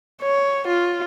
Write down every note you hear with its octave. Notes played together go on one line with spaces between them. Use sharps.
C#5
F4